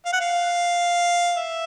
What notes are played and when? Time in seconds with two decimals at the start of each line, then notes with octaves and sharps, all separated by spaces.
0.05 F5
0.13 F#5
0.21 F5
1.37 E5